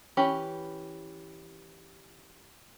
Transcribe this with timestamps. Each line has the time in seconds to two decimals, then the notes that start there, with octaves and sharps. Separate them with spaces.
0.17 E3 C#4 G4 B5